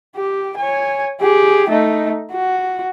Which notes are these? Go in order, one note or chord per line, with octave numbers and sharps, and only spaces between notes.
G4
C#5 G#5
G4 G#4
A3 D#4
F#4